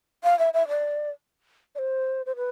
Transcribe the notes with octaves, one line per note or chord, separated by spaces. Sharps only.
F5
E5
E5
D5
D5
C5
C5
B4